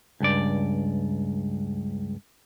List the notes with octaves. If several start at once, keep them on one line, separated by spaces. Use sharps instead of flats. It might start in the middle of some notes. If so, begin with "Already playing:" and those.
C#2 G2 D5